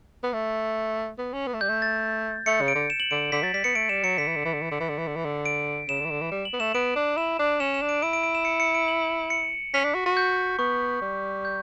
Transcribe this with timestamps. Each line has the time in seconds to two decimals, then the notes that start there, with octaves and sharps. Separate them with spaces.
0.23 B3
0.33 A3
1.18 B3
1.33 C#4
1.47 B3
1.54 A3
1.61 G3 G6
1.69 A3
1.82 A6
2.46 A3 C#7
2.61 C#3
2.68 D7
2.75 D3
2.90 E7
3.00 F#7
3.11 D3 D7
3.32 D3 B6
3.43 F#3 A6
3.54 G3 B6
3.64 B3 C#7
3.75 A3 D7
3.89 G3 E7
4.03 F#3 C#7
4.18 D3 B6
4.27 E3
4.36 D3
4.45 E3
4.53 D3
4.62 E3
4.72 D3
4.80 E3
4.89 D3
4.98 E3
5.07 D3
5.16 E3
5.25 D3
5.46 D7
5.89 C#3 E7
6.00 D3
6.05 E3
6.10 D3
6.22 E3
6.32 G3
6.45 F#7
6.53 B3
6.60 A3 E7
6.75 B3 D7
6.96 D4
7.17 E4 E7
7.39 D4
7.60 C#4 E7
7.74 E7
7.82 D4
7.89 D7
8.02 E4 D7
8.13 D7
8.23 D7
8.35 E7
8.45 C#7
8.60 C#7
8.75 D7
8.88 F#7
9.30 C#7
9.74 C#4 B6
9.84 D4
9.94 F#4
10.06 F#4
10.17 G6
10.59 B3 C#6
11.02 G3
11.45 G6